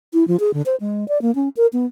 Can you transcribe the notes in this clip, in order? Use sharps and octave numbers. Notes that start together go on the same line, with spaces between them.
E4
F3
G#4
D3
C5
G#3
D5
A#3
C#4
A#4
B3